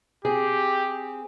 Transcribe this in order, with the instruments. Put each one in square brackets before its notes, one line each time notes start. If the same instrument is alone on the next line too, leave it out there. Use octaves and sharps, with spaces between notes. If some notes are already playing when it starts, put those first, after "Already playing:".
[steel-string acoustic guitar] C4 G#4 [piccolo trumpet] G4